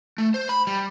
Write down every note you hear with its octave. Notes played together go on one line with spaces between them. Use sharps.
A3
C5
B5
G3